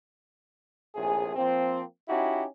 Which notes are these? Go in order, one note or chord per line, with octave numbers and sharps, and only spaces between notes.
A#1 A2 C3 G#4
F3 A#3 C4
C#4 D#4 E4 F#4 G4